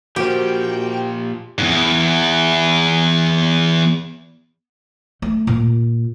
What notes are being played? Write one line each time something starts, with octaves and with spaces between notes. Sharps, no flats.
A#2 F3 F#4 G4 A#4 C5 G5
E2 G#2
A3
A#2